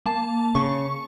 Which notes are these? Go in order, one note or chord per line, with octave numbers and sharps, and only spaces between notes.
A#3 A5
C#3 C#6